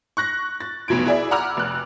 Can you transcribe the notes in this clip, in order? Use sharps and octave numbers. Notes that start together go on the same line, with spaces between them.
C#6 F#6 A#6
A6
F1 B1 B2 G#6 D7
E4 G#4 D5 E5
F#5 A#5 B5 D6 E6 F6
F1 F#6